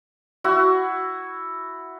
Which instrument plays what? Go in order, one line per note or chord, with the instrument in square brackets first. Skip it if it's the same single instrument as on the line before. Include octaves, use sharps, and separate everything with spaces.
[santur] E4 F#4